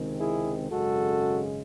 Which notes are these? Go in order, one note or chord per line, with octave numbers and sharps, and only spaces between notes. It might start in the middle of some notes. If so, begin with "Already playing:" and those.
Already playing: C#2 C3 D#3 G#3 C4
E4 G#4
G#1 F#2 C#3 G#3 F#4 A4